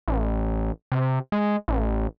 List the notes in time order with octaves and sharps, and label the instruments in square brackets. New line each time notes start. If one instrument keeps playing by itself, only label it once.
[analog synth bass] A1
C3
G#3
A1